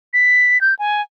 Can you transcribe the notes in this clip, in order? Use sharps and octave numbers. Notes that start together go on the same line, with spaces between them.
B6
G6
G#5